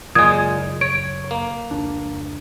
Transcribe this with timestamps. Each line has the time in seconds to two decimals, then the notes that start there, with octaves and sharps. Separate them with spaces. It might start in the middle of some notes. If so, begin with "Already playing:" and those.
0.15 F#2 A#2 C#3 F#3 G#3 D#6 G#6
0.81 C#5 D7
1.31 A#3
1.71 F1 C#2 D4